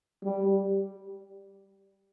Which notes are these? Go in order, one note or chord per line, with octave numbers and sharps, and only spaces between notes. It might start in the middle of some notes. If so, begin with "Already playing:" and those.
G3